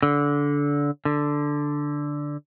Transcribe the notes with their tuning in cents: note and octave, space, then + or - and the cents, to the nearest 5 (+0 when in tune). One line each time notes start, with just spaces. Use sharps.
D3 -20
D3 +0